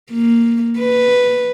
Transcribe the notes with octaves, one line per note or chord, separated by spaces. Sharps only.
A#3
B4